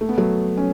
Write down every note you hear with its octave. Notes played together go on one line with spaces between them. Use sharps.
A3
B3
F#3 A3
C#4